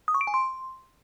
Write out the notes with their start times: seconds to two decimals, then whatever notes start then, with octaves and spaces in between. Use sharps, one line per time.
0.08 D#6
0.14 C#6
0.21 D7
0.27 G#5
0.34 C6